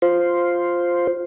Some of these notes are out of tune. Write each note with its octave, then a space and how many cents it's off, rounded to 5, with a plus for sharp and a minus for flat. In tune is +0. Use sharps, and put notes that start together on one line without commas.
F4 +0 C5 +0